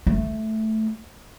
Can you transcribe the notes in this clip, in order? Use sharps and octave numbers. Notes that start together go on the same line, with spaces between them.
A3